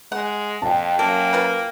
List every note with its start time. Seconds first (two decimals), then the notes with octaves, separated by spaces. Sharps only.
0.12 G#3 F#5
0.62 F2 G5 A5
0.99 F#2 A#3 A4
1.33 F4 A#4 B4